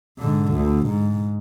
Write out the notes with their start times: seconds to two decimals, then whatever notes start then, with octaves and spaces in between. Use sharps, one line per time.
0.19 G#2 D3
0.53 D2
0.87 G#2